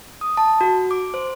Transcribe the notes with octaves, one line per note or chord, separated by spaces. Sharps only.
D#6
A5
F#4
D6
C5